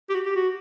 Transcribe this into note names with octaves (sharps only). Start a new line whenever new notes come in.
G4
F#4
G4
F#4